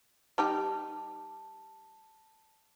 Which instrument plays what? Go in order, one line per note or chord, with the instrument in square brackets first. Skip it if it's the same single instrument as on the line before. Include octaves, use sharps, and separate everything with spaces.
[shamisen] G3 D#4 G4 [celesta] A5